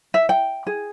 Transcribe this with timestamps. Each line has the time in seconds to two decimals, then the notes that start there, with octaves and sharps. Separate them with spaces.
0.14 E5
0.29 G5
0.67 G#4